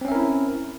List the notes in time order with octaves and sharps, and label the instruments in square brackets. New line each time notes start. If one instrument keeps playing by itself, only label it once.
[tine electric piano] C4
C#4
E5
A#4
E4